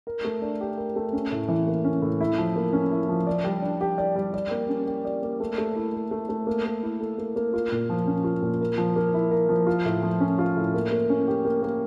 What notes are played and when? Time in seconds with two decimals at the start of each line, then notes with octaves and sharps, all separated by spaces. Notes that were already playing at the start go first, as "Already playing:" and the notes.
0.07 A#4
0.25 A3
0.42 D4
0.61 G4
0.78 A#4
0.96 A3
1.13 C#4
1.32 A2
1.48 E3
1.67 A#3
1.84 C#4
2.02 A2
2.21 E4
2.38 F3
2.56 A#3
2.73 C#4
2.92 E4
3.09 F3
3.27 D5
3.44 G3
3.62 D4
3.81 G4
3.98 D5
4.16 G3
4.34 D5
4.51 A#3
4.69 C#4
4.87 G4
5.05 D5
5.23 A#3
5.40 A3
5.58 A3
5.76 E4
5.94 A4
6.11 A3
6.29 A3
6.47 A#3
6.65 A#3
6.83 E4
7.01 A4
7.18 A#3
7.36 A#3
7.53 F4
7.72 A#2
7.90 F3
8.07 C#4
8.24 F4
8.43 A#2
8.61 A#4
8.78 F3
8.96 A#3
9.14 E4
9.31 A#4
9.49 F3
9.67 F4
9.85 A2
10.03 F3
10.20 C#4
10.39 F4
10.56 A2
10.74 A#3
10.92 A#3
11.10 C#4
11.28 G4
11.45 A#3
11.63 A#3